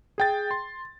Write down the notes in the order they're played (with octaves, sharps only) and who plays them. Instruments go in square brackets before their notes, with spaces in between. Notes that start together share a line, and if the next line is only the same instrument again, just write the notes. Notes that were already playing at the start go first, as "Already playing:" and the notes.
[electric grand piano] G#4 G5 A6
C6